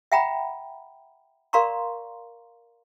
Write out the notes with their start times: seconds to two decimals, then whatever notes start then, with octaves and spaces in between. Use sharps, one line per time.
0.12 E5 F#5 G5 A#5 B5
1.53 A#4 D5 F5 A#5 C6 C#6